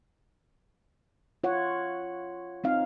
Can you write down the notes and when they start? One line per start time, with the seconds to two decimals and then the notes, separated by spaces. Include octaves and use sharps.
1.44 F4 C#5 F#5
2.64 C4 D#4 F5